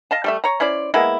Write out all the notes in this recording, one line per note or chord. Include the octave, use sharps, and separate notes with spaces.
D#5 F5 A5
G3 A3 E5
C#5 A#5
C#4 E4 C5 D5
G#3 A#3 B3 E4